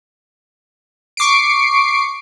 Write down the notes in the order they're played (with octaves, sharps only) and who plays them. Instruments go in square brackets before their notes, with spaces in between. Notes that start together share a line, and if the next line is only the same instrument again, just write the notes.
[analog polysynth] C#6 D6 C7 D7